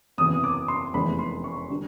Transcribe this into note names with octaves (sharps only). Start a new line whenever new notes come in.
F#1 E2 C3 E3 D#6
D6
C6
F1 E2 C3 E3 G#3 B5
C6
C#6
D3 G3